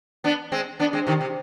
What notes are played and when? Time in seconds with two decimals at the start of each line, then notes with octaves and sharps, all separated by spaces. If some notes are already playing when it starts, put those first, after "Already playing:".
0.24 B3 D4
0.52 G#3 C4
0.79 B3 D4
0.93 G#3 C4
1.07 C3 D#3
1.21 C3